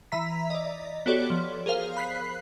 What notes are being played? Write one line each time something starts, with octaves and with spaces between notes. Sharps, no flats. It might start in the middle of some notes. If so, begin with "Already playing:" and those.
E3 E5 A#5 B6
D5 D#5
B3 F#4 G4 A4 C#5 D5
F3
G#4 A#4 C5 F5
B5 F#6 B6 C7